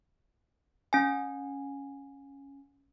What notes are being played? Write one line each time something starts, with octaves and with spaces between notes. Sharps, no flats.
C#4 G#5